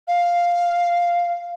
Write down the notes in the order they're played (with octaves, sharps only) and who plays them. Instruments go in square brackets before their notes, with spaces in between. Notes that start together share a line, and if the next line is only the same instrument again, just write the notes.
[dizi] F5